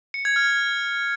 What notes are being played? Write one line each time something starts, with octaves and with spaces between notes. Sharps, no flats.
C#7
G#6
F6